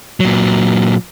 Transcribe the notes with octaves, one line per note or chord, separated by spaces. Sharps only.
A#2 F#3